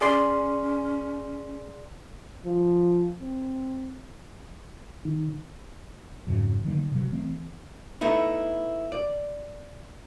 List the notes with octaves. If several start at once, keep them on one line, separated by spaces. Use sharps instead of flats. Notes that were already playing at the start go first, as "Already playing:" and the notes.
C#4 G#4 D5 C6
F3
C4
D#3
F2 G#2 C#3 F#3
D3 D#3 F#3 A#3
C3 F#3
E3 A3 C4
A3 B3 D#4 E4
D5